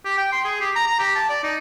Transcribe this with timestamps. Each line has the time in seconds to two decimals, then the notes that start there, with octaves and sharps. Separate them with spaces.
0.05 G4
0.18 G5
0.32 C6
0.45 G#4
0.61 G4
0.76 A#5
0.87 A#5
0.99 G4
1.15 A5
1.29 D5
1.43 D#4